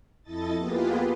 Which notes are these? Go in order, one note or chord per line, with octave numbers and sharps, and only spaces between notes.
F2 E4 A4 D#5 A6
A#3 B3 F4 G4 G#4 B4